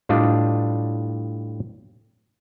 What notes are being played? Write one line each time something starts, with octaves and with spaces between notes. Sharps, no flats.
A2 G3 D4 F4 D5 D#5